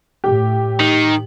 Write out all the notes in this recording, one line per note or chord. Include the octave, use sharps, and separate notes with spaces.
A2 G4
D#3